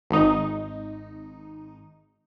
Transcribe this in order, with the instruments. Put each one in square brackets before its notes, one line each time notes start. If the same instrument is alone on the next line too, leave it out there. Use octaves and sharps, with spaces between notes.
[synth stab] G#1 D#4